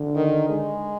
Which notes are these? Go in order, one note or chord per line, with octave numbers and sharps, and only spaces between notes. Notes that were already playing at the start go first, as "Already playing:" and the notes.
Already playing: D3
D#3
G#3